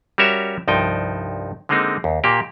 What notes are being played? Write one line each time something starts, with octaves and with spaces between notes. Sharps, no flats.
G3 C#4 F#4 A#4 C#5 E5
C2 G2 F3 D#4 G5
D3 G#3 A#3 C4 D#4
D#2
A#2 A#3 G4